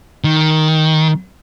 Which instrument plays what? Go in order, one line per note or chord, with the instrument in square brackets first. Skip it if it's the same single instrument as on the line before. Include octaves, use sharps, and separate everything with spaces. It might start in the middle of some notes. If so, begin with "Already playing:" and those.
[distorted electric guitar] D#3